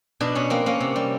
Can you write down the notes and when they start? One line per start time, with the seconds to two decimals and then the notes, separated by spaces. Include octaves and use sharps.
0.20 B2 D4
0.35 B2 C#4
0.50 A#3 C4
0.66 A#3 C#4
0.80 C3
0.96 G3